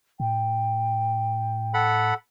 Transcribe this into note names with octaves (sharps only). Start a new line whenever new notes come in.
A2 G5
A4 F#5 B5